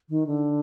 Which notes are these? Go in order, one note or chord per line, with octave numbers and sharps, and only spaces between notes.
D#3
D3